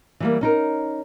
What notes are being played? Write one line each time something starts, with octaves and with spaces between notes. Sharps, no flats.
E3 G3 A#3
C#4 D#4 A#4